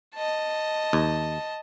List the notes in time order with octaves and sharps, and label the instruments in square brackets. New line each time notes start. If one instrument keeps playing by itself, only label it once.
[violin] D#5 A5
[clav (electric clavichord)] D#2